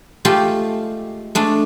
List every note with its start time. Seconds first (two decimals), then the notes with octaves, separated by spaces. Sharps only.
0.25 G#3 A3 F4 G4
1.35 G#3 A3 D4